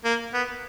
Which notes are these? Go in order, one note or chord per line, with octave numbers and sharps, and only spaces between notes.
A#3
B3